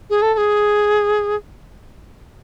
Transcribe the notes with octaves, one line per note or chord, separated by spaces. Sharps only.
G#4
A4
A4
G#4